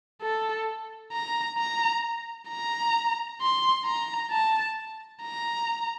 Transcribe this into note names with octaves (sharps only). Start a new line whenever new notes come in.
A4
A#5
A#5
A#5
C6
A#5
A5
A#5